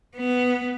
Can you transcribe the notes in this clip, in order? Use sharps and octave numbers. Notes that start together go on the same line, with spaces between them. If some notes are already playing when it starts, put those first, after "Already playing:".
B3